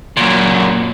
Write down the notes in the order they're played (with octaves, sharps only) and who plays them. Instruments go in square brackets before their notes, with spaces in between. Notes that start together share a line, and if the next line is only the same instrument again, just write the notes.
[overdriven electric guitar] F#2 A#2